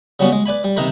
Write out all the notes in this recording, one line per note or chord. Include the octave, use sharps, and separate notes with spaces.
C#3 F#3 G3 B3 C#4
G#3
B4 D5 G#5 B5
G3
C3 D#3 D#4 A#4 B4 B5